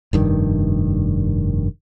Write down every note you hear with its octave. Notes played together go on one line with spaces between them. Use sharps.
F1 G2 D#3